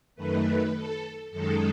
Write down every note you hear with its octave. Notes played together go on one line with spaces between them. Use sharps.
F#2 D#3 A3 B4
A4
F#2 D#3 G#3 A4